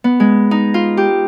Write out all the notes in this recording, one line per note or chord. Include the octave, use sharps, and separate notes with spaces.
B3
G#3
D#4
F4
G4